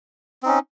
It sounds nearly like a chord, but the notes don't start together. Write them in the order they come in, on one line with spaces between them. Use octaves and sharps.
C4 D#4 C#4